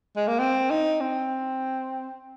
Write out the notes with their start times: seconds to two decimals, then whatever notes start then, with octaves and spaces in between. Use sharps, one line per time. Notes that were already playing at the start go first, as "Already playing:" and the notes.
0.17 G#3
0.28 A#3
0.39 C4
0.70 D#4
1.01 C4